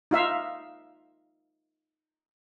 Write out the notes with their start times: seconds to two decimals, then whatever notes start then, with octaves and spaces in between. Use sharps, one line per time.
0.11 D#4 F4 E5 F5